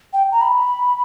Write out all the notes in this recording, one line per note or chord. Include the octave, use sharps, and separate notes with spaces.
G5
A#5
B5